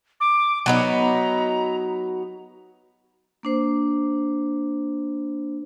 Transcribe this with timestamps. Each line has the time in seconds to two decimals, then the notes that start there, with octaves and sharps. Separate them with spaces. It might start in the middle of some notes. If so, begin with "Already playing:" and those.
0.20 D6
0.66 F#3 B3 D#4 A#5
3.43 A#3 D4 C5